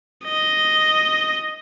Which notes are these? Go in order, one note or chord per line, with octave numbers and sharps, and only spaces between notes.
D#5